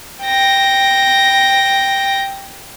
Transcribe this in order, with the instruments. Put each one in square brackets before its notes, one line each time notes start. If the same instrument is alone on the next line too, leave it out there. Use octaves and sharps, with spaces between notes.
[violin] G5 A#6